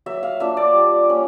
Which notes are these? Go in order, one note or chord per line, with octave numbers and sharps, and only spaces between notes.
F#3 E5
F5
A#3 D4 F4 E5
D5
G3
A#3 C#4